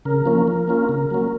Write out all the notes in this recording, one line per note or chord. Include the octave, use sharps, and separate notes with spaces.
C#3 A#4
F3 A#3 C#4
F3
A#3 C#4 F4
C#3
F#3 A#3 C#4